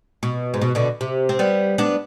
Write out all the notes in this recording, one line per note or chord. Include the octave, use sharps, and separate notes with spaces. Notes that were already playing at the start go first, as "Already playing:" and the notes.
B2
G#2
B2
B2 D3
C3
C4
G3 B3
B3 D4